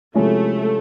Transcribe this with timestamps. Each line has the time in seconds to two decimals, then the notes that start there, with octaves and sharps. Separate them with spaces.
0.14 C3 F3 G#3 A3 C#4 E4